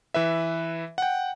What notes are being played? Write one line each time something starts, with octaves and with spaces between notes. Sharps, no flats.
E3 B4 E5
F#5 G5